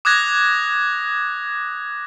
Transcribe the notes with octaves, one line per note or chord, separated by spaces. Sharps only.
D6 D#6 F#6 G#6 A#6